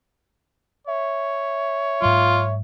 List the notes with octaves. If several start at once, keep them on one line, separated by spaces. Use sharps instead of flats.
C#5 E5
G#2 F#3 F4